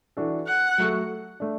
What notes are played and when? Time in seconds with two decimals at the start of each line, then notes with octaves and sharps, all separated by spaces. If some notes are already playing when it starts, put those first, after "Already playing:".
0.17 E3 D4 F#4 A4
0.48 F#5
0.78 F#3 A3 F#4 A4
1.40 A3 D4